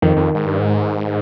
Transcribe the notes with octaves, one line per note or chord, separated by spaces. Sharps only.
F2 D#3
F2
G#2
G2
G#2